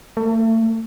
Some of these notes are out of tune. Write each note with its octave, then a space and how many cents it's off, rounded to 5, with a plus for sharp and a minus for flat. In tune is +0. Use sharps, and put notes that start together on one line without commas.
A3 +35